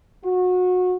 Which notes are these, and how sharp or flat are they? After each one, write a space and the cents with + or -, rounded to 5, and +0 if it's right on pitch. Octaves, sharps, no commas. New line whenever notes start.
F#4 -25